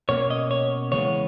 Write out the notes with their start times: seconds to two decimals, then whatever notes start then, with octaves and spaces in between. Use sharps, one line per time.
0.09 B2 A#3 C#4 C#5
0.30 D#5
0.51 C#5
0.92 E2 C#3 E3 G#3 B3 C#5